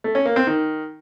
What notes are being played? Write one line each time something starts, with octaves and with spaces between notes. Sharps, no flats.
A3
C#4
A#3
C4
D#3